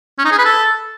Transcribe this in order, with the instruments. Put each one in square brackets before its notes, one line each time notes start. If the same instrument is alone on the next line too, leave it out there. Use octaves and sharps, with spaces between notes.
[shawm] C#4
D#4
G#4
B4
A4